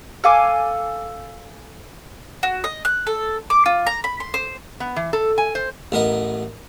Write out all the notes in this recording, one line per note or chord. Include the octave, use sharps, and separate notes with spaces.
A4 F5 G#5 D6
F#4
D#5
F#6
A4
D6
F4
A#5
B5
C6
C5
B3
E3
A4
G#5
C5
A1 B3 A#4 D#5